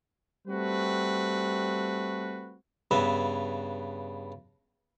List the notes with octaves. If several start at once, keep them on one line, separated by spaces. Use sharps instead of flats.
G3 A3 C4 F#4 B4
G2 C#3 B3 E5